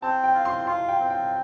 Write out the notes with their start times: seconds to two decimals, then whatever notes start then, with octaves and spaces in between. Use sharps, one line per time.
0.02 C4 A5
0.24 G5
0.34 F4
0.45 C6
0.67 F4 C6
0.89 G5
1.00 C4
1.10 G5